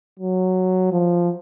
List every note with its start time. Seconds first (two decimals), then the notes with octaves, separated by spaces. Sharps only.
0.20 F#3
0.92 F3